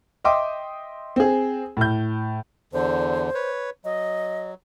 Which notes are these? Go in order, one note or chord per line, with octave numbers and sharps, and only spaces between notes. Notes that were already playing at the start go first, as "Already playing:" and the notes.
D#5 E5 G5 C6 D6 D#6
C4 G#4
A2 G6
E2 D3 C5
B4 C#5
F#3 D#5